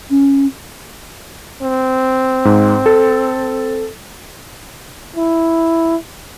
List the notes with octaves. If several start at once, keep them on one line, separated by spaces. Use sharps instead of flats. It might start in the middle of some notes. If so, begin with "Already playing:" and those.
C#4
C4
G#2
A4
E4